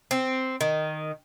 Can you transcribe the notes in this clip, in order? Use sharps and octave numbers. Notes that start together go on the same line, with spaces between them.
C4
D#3